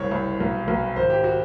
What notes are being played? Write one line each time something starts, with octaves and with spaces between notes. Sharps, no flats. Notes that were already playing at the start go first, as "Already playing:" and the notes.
Already playing: F#1 C2 C#5
C2
B1
B1
G#1 C5
G4
F#4